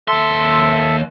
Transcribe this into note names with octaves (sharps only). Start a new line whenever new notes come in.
D#2 A4 E5 C6